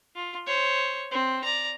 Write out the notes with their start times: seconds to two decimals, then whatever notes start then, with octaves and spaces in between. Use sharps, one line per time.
0.15 F4
0.46 C5 C#5
1.12 C4
1.44 D5 A#5